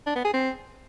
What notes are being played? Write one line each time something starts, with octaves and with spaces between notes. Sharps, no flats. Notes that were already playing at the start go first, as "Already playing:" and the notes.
D4
B3
G#4
C4